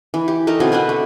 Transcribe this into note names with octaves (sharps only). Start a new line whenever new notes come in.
E3
G4
A3 D#4 A#4 A5
B2 D3 C4 G#5
B3 D4 B4 G#5
A3